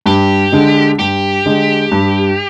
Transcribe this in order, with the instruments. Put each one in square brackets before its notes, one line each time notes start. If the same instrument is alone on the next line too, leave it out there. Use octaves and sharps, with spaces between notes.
[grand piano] G2 [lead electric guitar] G4
[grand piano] D3 G#3
[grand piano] G2 [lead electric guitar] G4
[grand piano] D3 G#3
G2